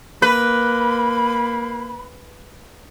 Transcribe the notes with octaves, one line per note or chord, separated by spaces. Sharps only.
A#3 B4 B5